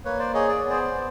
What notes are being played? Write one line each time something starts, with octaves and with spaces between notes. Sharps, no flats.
A#3 B4 C#5
C5 D5
G#4 C#5 D#5
D5
B3 C#5
C5 D5
B3